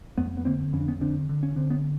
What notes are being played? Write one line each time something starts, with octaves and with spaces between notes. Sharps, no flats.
F2 A3 B3
B3
D3 A#3 C4
F2 C#4
D4
B3 C#4
D3 C4 D4
D3
C#4
D3 C4
B3 C#4